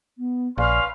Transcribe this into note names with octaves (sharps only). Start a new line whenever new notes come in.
B3
A#1 C#4 B4 D5 F5 C6